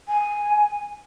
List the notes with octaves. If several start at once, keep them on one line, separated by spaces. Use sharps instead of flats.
G#5